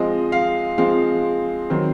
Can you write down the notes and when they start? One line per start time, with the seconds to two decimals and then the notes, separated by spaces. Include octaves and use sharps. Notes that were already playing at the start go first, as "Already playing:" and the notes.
Already playing: F3 G#3 C4 D#5
0.32 F5
0.78 F3 G#3 C4 F5
1.70 D#3 F#3 C4